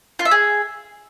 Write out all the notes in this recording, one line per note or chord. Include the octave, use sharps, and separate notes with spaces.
F4
E5
G#4